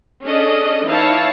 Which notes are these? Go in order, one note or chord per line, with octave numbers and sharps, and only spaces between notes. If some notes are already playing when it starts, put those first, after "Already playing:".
C#4 D4 G#4 A4 D#5
E3 D#4 E4 C#5 F5 A5